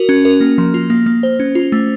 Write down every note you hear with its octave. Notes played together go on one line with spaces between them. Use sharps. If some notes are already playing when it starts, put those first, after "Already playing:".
Already playing: F#4 A#4
C#4
A#4
A#3
F3
F4
A#3
A#3
C5
C#4
F4
A3